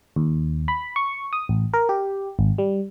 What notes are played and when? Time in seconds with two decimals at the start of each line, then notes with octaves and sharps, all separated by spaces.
0.16 D#2
0.68 B5
0.96 C#6
1.33 D#6
1.49 A1
1.74 A#4
1.89 G4
2.39 G#1
2.58 G3